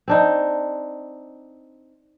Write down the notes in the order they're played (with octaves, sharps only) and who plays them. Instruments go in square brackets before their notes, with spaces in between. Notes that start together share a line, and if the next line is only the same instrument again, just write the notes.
[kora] C4 D4 D#4